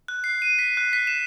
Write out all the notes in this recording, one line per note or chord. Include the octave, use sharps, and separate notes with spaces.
F#6
C7
D#7
B6
F#6
B6
E7